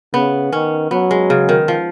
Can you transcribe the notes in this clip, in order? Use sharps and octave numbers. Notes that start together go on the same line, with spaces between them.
C#3 B3
D#3 C#4
F#3 B3
G#3
C#3
D#3
F3